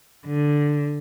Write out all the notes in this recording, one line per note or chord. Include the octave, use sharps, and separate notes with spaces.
D3